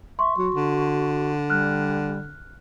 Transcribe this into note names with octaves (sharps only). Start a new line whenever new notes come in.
E5 C6 C#6
F#3 F#4
D3
G3 F6 F#6